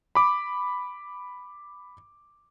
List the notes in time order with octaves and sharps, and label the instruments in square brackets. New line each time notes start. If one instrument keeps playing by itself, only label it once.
[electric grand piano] B5 D6